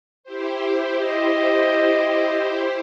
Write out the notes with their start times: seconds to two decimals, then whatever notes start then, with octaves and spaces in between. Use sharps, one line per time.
0.24 E4 G4 C5
1.04 D#5